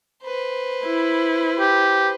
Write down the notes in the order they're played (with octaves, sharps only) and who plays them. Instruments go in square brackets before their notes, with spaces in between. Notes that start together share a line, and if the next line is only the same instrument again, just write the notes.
[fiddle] B4 C5
[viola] E4
[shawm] G4